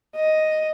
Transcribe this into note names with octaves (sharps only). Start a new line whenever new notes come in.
D#5